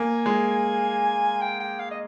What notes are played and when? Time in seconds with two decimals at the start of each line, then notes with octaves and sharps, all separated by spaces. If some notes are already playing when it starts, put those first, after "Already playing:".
Already playing: A#3 G#5
0.26 G#3
1.41 G5
1.60 G5
1.79 F5
1.91 D#5